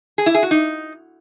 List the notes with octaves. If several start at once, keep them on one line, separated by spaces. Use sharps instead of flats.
G#4
E4
G#4
F#4
D#4